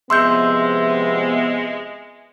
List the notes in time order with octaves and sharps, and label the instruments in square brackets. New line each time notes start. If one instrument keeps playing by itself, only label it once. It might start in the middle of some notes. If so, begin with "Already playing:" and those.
[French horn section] C3 F3 B3 [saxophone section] G#3 [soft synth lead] E5 [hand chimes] C6 E6 G6